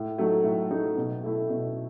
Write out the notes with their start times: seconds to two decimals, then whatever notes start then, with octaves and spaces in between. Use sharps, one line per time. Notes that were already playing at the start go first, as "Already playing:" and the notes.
Already playing: A2
0.18 F#3 A3 D#4
0.44 A2
0.71 F#3 A3 D#4
0.97 B2
1.23 A3 E4
1.49 B2